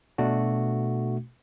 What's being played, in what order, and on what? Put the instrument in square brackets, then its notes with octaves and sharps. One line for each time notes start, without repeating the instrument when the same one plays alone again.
[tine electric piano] B2 A3 D4 F#4